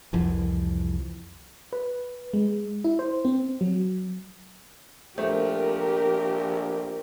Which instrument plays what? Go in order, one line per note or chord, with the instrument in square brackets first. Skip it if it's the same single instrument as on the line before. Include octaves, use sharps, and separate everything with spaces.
[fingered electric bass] C2 F2 E3 F3
[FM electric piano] B4
G#3
E4
C5
C4
F#3
[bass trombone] A#1 [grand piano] A3 [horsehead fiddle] G4 A#4 [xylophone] C5